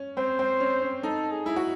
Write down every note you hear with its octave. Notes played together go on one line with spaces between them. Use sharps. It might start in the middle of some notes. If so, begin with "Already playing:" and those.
Already playing: C#4
C4 C5
C4
C#4
C#4
D#4 A4
G#4
E4
F#4